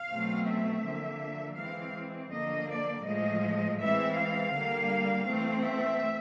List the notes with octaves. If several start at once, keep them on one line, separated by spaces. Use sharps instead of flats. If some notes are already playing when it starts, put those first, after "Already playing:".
Already playing: F5
B2 F#3 A3 C4
E5
D3 F3 A#3
E3 G#3 C4 F5
D3 F3 A#3 D#5
D5
A2 F3 G#3 D#5
E3 G#3 C4 E5
F5
D3 G3 A#3
E3 A3 C4
E5